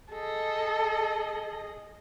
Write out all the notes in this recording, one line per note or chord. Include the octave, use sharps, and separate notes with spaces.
G#4 A4 D#5